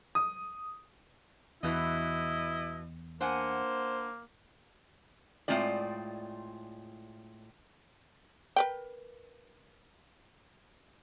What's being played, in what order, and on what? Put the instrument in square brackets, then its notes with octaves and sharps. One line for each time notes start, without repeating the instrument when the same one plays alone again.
[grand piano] D#6
[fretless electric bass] E2 [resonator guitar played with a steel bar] G2 B2 E3 [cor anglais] E4 [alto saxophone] D#5
[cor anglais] A#3 [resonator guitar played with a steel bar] D4 F#5 G#5 [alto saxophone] C5
[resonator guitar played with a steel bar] A2 G#3 C4 F4 D5
[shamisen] A#4 B4 G5